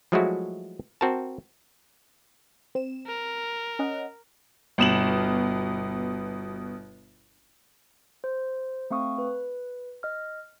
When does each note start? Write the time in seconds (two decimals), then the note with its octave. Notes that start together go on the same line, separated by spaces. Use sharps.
0.12 F3 F#3 G#3 A3 E4 F#4
1.01 C4 F#4 A#4 A5
2.75 C4 E7
3.07 A#4
3.79 C#4 D#5 F#5
4.78 G1 B2 E7 F#7
8.24 C5
8.90 A3 C4 F5 C#6 D#6
9.18 B4
10.03 D#5 F6